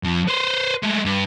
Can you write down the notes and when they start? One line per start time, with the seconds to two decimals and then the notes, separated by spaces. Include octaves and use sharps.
0.04 F2 F3
0.29 B4 C5
0.83 G#3 A3
1.05 G2